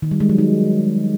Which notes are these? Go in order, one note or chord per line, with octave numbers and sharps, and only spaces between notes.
D#3
G3
G#3
F#3
D#4